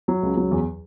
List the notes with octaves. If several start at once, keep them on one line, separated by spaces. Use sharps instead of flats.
F#3
C#2
F#3
E2